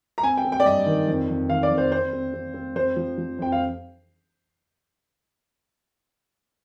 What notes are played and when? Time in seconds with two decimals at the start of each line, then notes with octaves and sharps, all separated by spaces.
0.18 A#5
0.23 C4 G#5
0.37 G5
0.45 C4
0.52 G5
0.60 D5
0.65 G2 D#5
0.86 D#3
1.08 F2
1.29 F2
1.49 D#3 F5
1.63 D5
1.70 F2
1.78 C5
1.92 C4 C5
2.13 C4
2.34 C4
2.54 C4
2.75 F2 C5
2.96 F3
3.18 F3
3.39 F2 G5
3.52 F5